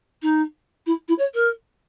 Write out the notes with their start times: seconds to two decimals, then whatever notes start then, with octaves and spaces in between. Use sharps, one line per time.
0.22 D#4
0.86 E4
1.08 E4
1.18 C#5
1.33 A#4